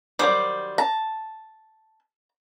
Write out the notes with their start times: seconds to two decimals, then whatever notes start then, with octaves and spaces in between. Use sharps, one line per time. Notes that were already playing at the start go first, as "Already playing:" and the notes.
0.19 D#3 F#3 G3 C5 D6
0.78 A5 A#5